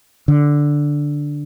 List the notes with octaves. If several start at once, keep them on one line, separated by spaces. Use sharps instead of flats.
D3